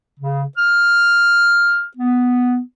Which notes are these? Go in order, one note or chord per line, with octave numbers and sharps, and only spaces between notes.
C#3
F6
B3